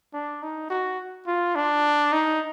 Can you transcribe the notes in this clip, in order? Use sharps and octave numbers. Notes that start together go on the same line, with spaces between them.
D4
D#4
F#4
F4
D4
D#4